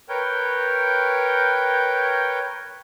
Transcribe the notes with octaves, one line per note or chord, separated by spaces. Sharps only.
A#4 B4 C#5 G5 G6